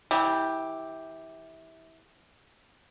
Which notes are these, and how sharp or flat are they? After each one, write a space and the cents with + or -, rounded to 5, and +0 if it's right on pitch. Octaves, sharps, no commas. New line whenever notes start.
E3 -20 G4 +0